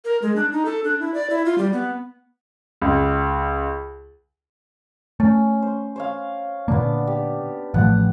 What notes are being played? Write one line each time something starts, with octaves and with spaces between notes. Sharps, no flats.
A#4
G#3
D4
D#4
A4
D4
E4
D5
E4
F4
G3
B3
C#2
A3 C#4
C5
C5 C#5 F5
A#2 D3 A#3 B3 D4
G4
A1 F3 A3 F#5